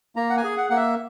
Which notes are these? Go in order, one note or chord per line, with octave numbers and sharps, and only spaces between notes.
A#3 A#5
F#5
G#5
G#4
F#5
A#3 F#5
E5